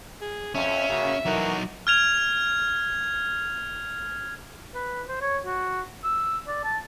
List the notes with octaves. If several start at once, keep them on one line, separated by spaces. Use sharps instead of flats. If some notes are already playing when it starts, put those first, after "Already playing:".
G#4
F2 C#4 E5
C#3 A#3 F#4
E3 F#3 D#4 F#4 A#4
F6 G#6 F7
B4
C5
C#5
F#4
E6
D5
A5